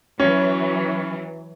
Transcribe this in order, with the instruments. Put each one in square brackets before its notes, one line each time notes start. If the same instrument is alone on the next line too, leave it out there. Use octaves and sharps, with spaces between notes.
[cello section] E3 F#3 [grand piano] C#4